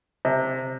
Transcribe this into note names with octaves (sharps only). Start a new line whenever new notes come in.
C3